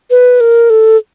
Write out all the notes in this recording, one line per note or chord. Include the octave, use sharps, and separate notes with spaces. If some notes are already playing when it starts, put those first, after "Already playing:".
B4
A#4
A4